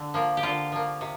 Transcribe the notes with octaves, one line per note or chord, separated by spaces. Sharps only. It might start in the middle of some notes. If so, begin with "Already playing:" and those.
Already playing: D3
F3 A#3
G4
D3 F4
F3 A#3
C3